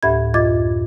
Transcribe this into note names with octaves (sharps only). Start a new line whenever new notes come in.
D2 A2 G4 E5 B5 G#6
F#2 F4 D#5 D6 G#6 A6